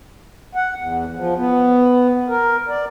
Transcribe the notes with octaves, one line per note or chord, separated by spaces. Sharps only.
F#5
E2
F3
B3
A#4
D5